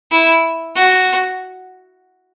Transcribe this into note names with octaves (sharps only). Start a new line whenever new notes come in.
E4
F#4